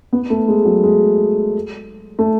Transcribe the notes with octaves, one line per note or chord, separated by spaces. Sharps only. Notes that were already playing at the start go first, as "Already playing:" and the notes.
B3
A3
G#3
F#3
G#3
A3